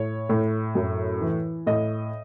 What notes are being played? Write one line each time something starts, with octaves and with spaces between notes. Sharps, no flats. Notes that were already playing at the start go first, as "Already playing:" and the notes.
Already playing: A2 C#5
A2
F#2
E3
A2 D#5